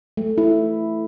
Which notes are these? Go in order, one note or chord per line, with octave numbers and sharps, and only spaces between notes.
A3
E4